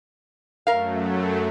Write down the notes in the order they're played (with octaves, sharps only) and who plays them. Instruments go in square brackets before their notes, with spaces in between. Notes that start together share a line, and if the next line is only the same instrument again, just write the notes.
[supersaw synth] F#2 F#3 A3 [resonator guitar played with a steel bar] A#4 F5